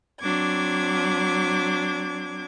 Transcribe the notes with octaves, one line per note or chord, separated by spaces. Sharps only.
F#3 C4 D4 D6 G#6